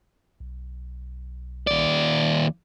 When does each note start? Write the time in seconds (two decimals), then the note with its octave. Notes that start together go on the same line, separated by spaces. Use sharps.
0.40 B1
1.67 D#2 D5